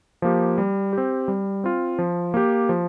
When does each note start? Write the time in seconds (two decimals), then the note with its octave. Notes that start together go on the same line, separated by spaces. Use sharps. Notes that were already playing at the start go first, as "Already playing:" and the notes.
0.22 F3 A#3 G4
0.58 G3
0.93 C4 G4
1.28 G3
1.64 C4 F4
1.98 F3
2.34 A#3 G4
2.69 F3